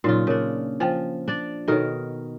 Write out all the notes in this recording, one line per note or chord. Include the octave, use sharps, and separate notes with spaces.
A#2 C#3 F#3 D#4 F4
C#3 D4 A#4
F3 C5 G5 G#5
D4 D5
B2 D#3 A4 A#4 C#5